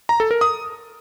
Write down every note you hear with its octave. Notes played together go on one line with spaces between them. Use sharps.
A#5
A4
A#4
D#6